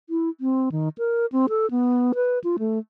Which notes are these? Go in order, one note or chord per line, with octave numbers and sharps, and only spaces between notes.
E4
C4
D#3
A#4
C4
A4
B3
B4
F4
A3